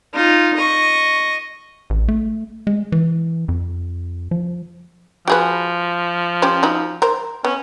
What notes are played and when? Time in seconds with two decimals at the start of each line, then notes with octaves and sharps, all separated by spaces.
0.13 D#4 F4
0.56 D#5 C#6
1.90 A1
2.08 A3
2.67 G#3
2.92 E3
3.48 F2
4.31 F3
5.28 F3 F#4 G#4 B4
6.42 C#4 G4 C5
6.63 D#4 F#4
7.02 A#4 C5
7.45 B3 C#4